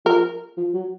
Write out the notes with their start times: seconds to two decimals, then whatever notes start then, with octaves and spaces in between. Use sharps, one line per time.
0.06 F3 A#4
0.57 F3
0.74 F#3